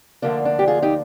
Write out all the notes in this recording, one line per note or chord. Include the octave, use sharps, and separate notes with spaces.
D2 D3 F3 A#3 D4
D4
G4
F4 G#4
D#4 G4